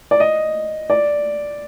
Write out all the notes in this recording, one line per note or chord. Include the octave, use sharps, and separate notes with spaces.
D5
D#5
D5